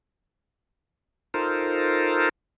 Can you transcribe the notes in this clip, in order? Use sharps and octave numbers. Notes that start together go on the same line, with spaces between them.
D#4 F4 A4 A#4 C5